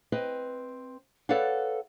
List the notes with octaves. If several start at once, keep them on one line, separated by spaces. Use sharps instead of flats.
C4 B4 D#5
A4 B4 C#5 D5 F5 F#5